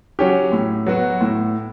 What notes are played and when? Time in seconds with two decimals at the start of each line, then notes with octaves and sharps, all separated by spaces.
0.19 F#3 C#4 G4
0.52 A2
0.86 F#3 B3 F#4
1.21 A2